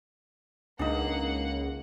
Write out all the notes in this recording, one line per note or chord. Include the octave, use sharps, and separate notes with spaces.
C#2 A#3 D4 D#4 F#5